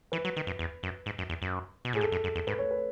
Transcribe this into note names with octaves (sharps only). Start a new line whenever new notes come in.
E3 B4
F#3
D#3
F#2
E2
F#2
G#2
F#2
E2
F#2
B2
A2 G#4
G#2 A4
F#2
F#2
E2
G#2 B4
C#5
B4